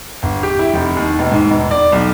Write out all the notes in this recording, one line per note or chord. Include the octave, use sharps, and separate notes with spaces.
G1
G4
E4
F1
D#2
E1
G#2
E1
D5
B1